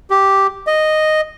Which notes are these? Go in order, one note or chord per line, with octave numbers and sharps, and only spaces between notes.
G4
D#5